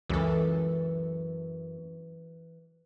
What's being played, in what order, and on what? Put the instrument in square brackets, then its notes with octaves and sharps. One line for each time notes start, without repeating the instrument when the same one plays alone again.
[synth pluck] C#2 A4 [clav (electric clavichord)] F#2 [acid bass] E3